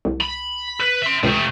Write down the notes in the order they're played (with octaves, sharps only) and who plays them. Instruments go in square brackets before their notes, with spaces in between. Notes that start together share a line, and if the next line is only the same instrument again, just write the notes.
[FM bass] C2
[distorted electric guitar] B5
B4
E5 C6
[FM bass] C#2 [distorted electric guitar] C3 A3